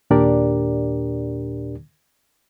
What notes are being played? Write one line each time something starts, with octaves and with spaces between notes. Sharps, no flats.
D#2 A#2 D4 G4 A#4 D5